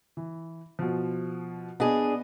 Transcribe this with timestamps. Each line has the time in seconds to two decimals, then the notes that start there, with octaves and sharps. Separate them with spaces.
0.17 E3
0.79 B2 F3
1.80 B3 D4 G#4 D#5